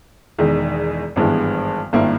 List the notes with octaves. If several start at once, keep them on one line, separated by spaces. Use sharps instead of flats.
E1 E2 D#3 G#3
G#1 G2 E3 G#3 B3
G#1 G2 D#3 A#3 E4